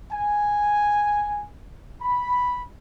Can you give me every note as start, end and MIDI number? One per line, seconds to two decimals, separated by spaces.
0.12 1.47 80
2.02 2.64 83